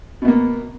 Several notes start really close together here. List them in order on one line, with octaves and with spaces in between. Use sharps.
B2 B3 A#3